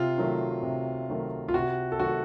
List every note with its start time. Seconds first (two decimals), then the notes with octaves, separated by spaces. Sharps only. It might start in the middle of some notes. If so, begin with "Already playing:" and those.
Already playing: C3 F4
0.18 D#3 F#3 A3
0.63 C3
1.09 D#3 F#3 A3
1.48 F4
1.54 C3 F#4
1.92 A4
1.99 D#3 F#3 A3 F#4